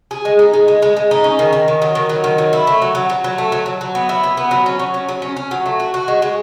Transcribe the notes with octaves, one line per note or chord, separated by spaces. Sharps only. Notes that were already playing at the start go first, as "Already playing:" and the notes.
G#4
G#3
D#4
G#3
G#3
G#3
G#3
D#4
C#4
D#3
D#3
D#3
F#3
D#3
F#3
D#3
F#3
E4
A3
F#3
F#3
F#3
F#3
A3
F#3
F#3
F#3
B3
E4
B3
B3
F#3
C#4
F#3
C#4
F#3
C#4
C#4
F#3
A3
F#4
F#4
G#3
G#3